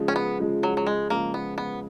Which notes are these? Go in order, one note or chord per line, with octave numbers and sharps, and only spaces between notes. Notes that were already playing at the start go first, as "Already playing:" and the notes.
Already playing: C#3 F3 G#3
C#4
B3
C#3 F3 G#3
F#3
F#3
G#3
C#3 F3 G#3 A#3
B3
B3